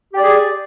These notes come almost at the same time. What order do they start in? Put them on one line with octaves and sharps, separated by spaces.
G4 D5 G#4